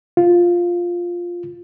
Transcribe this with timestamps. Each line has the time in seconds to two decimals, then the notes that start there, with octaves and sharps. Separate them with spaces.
0.17 F4